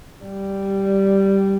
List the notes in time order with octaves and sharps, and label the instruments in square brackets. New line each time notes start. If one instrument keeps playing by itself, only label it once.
[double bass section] G3